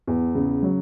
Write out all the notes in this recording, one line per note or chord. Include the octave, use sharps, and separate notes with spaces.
E2
C#3
F#3